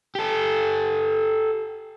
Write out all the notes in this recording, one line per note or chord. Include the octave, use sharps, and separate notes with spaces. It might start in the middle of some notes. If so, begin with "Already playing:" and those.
G4 A4